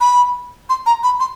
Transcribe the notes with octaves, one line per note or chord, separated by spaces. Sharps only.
B5
C6
A#5
B5
C6